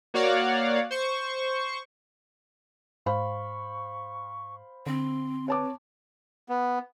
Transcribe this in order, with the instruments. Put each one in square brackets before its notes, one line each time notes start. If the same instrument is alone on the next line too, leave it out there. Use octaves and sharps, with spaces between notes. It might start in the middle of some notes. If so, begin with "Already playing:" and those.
[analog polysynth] A#3 F#4 C#5 D5 F5 F#5
C5 C#6
[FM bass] G#2 [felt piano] C5 F5 B5 [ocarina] C#6
[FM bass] D3 [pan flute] C4 [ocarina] C6
[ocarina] B4 [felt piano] C#5 A5 D6
[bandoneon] B3